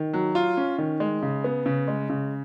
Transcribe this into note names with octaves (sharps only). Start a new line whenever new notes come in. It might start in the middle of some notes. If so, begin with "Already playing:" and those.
Already playing: D#3
F#3
F4
C#4
D#3
G#3
C#3
B3
C#3
G#3
C#3